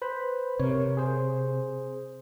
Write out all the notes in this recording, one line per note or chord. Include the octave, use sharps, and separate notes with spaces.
B4 C5 B5
C3 A#4 C#5
G#4 C5